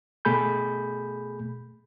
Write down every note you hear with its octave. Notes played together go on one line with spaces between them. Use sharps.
B2 A3 G#4 B5 G6